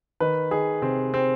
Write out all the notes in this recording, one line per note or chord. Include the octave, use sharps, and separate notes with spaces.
D#3 B4
D#3 G#4
C3 C4
C4